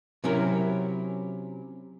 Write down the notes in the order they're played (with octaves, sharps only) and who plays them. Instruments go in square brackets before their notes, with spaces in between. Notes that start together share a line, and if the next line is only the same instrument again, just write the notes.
[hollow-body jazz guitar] C3 F#3 C#4 E4 A#4